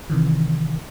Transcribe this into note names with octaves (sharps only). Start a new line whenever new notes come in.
C3 D#3 E3